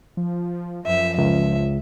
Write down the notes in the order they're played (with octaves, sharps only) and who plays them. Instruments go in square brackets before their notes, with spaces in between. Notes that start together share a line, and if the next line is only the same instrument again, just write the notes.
[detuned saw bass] F3
[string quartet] F#2 E5 [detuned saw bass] F3
[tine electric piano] C#2 [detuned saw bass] F3 [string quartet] E5